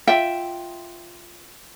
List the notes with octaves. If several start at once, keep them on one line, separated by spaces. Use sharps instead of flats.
F4 E5 G5